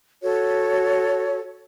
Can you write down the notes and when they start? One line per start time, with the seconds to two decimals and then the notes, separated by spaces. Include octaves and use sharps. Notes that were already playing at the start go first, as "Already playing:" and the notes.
0.22 F#4 A4 C#5